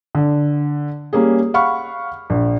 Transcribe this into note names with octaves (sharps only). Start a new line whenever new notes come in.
D3
G3 A#3 C#4 G#4
F5 F#5 B5 C#6 F6
A#1